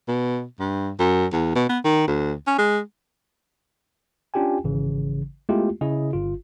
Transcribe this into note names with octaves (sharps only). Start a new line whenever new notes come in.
B2
G2
F#2
E2
B2
B3
D#3
D2
C#4
G#3
C#4 D4 F4 G4 G5 G#5
G#1 C#3 E3
G#3 A3 B3 E4 F4 G4
C#3 E4 G#4 D#5
G1 F4